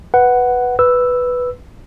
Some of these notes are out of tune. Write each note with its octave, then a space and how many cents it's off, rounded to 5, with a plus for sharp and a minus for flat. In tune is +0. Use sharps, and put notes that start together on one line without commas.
B4 +0 F#5 +5
B4 +0 E6 +0